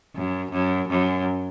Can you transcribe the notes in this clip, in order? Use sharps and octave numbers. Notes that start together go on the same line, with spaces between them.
F#2
F#2
F#2